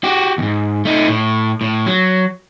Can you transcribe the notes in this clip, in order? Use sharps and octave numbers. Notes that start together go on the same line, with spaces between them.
F#4 G4
D#2 G#2
A3 D#4
A2
A2
F#3